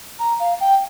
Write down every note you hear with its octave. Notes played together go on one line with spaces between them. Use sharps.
A#5
F5
G5